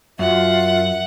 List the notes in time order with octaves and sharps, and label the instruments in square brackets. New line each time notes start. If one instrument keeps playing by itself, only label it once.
[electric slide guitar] F#2 [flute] F4 [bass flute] E5 [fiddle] F#5